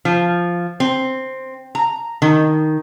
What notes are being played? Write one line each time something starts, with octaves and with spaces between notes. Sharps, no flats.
F3
C4
A#5
D#3